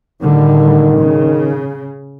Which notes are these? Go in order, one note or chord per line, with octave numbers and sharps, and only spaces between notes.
A2 D3 D#3 G3
C#3